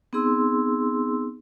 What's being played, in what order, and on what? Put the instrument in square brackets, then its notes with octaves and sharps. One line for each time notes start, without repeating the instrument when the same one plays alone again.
[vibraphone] B3 C4 D#4 G#4 C6 E6